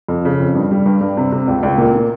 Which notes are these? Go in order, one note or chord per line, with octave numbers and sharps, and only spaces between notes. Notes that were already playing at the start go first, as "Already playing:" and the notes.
F2
C#3
F2
G2
G3
G2
G2
C3
C3
C#2
C#2
A#2
A#2